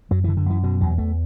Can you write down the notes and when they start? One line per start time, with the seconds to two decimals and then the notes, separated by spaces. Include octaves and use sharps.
0.11 F#2 F#3
0.24 D3 E3
0.37 D3
0.46 F#2 E3
0.63 B2 F#3
0.81 E2 F#3
0.98 E2 A3